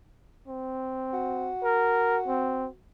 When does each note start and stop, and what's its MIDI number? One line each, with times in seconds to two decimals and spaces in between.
0.48 1.51 60
1.13 2.77 66
1.63 2.20 70
2.28 2.68 60